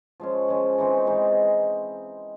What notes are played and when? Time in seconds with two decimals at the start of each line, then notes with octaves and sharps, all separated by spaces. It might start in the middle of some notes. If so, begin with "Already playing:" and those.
0.20 F3 G#3 C#4
0.48 F3 G#3 C#4
0.78 E3 G#3 C4 D#4
1.06 E3 G#3 C4 D#4